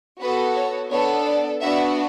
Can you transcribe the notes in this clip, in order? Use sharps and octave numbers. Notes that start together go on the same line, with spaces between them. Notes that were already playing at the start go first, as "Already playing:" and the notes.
B3 F#4 A4 B4
C#5
B3 D4 A4 C#5
D5
B3 D4 F#4 E5